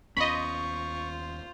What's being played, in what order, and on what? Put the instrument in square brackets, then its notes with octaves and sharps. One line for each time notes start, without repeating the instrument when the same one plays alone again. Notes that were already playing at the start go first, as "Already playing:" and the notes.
[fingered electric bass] D#2 B3 C#4 [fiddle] F4 C5 [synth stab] D#5 B5 [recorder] C#6